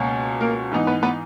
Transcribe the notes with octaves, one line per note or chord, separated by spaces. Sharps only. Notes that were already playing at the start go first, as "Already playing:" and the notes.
Already playing: C#2 B2 A#3 C#4
A#3 A#4
G#2 E3 B3 D#4
B3 B4
B3 B4